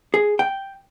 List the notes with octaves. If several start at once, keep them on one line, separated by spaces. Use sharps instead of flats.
G#4
G5